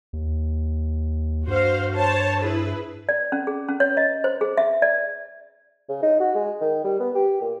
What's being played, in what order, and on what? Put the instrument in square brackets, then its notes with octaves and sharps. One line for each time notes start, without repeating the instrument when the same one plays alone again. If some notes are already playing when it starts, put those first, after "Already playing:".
[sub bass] D#2
[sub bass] G2 [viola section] F#4 C5 F5
[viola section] C5 C#5 A5
E4 G#4 B4
[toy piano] D5
C#4
G#4
C#4
C#5
D#5
C5
G#4
E5
D5
[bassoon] C#3
D#4
F#4
G#3
D#3
G3
B3
G4
A#2